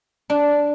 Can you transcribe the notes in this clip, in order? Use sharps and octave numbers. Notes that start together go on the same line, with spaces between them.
D4